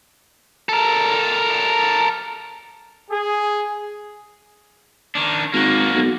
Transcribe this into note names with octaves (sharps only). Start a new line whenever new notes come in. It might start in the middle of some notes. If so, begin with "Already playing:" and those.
A4 A#4
G#4
D#3 D4
G#1 A#3 F#4
B1